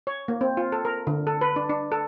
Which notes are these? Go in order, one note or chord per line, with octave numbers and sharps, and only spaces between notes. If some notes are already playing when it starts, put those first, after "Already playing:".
C#5
A#3
C4
F4
A4
A#4
D3
A4
B4
D4
D4
A4